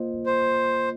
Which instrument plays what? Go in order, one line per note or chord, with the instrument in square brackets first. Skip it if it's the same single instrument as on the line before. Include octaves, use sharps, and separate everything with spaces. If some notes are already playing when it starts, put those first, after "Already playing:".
Already playing: [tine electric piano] A#3 F4 C5 D#5
[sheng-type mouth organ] C5